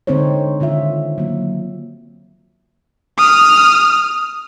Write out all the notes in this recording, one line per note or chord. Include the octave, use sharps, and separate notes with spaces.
D3 G#3 C4 D#4 C5 C#5
D3 D#3 F4 E5
F#3 A#3
D#6 F6